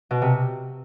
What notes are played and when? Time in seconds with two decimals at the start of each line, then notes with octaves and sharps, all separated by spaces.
0.11 B2
0.22 C3